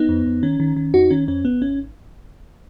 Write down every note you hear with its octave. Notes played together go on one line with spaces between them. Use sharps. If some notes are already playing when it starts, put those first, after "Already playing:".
Already playing: B3 D#4
F2
F2
D#3 C#4
D#3
D#3
F2 D#4 F#4
D#3 C#4
F2 C#4
G#1 B3
G#1 C#4